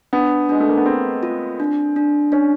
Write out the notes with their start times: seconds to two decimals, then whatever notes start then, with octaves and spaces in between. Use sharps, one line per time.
0.13 B3 D4
0.49 G#3 D4
0.60 A3
0.69 A#3
0.77 B3
0.86 C4 G#4
1.23 F4
1.60 D4
1.96 D4
2.32 C#4 D4